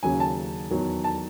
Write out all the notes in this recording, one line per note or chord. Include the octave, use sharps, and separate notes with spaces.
D#2 C#3 F#3 G#5
A5
E2 D#3 F#3
A5